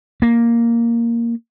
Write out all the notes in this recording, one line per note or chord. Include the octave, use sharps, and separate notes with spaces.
A#3